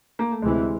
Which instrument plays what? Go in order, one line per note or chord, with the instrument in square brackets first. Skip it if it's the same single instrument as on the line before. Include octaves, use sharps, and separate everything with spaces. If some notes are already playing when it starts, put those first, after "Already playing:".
[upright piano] A#3
A3
[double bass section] D2 C3 E3 [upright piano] G#3